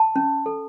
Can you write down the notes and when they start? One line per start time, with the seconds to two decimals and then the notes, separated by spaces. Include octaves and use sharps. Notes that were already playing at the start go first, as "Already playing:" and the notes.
Already playing: A5
0.16 C#4
0.46 A4